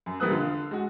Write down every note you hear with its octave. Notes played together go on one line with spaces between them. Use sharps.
F#2
E1 G3 A#3 B4 D#6 F#6
D3 F4
G#3 F#4